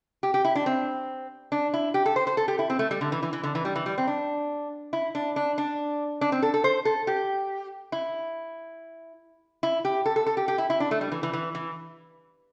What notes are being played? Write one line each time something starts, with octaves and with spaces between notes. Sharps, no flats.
G4
G4
E4
D4
C4
D4
E4
G4
A4
C5
C5
A4
G4
E4
C4
A3
G3
D3
E3
E3
E3
D3
E3
G3
E3
G3
C4
D4
E4
D4
D4
D4
D4
C4
A4
A4
C5
A4
G4
E4
E4
G4
A4
A4
A4
G4
G4
E4
E4
D4
A3
G3
E3
E3
E3
E3